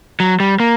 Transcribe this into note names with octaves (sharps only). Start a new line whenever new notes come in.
F#3
G3
A#3